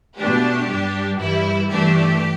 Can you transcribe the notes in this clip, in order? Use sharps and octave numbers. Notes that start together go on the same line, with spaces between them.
B2 A3 D4 G4
G2 G3 D4
G2 E3 G3 E4
G2 E3 A3 D4 G4